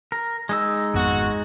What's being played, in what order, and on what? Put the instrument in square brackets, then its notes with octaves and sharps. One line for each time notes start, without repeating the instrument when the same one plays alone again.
[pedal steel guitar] A#4
G#3 D#4 E6
[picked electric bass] G#1 F2 B3 [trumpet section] F#4